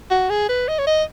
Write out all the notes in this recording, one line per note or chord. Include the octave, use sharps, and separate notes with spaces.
F#4
G#4
B4
D#5
C#5
D#5